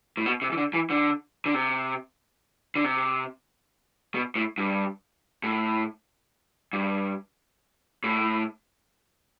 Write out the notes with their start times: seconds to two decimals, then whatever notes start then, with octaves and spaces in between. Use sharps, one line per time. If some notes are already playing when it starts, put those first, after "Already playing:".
0.17 A2
0.26 B2
0.42 C3
0.52 E3
0.57 D3
0.73 E3
0.90 D3
1.46 D3
1.54 C3
2.75 D3
2.84 C3
4.14 B2
4.36 A2
4.58 G2
5.43 A2
6.73 G2
8.04 A2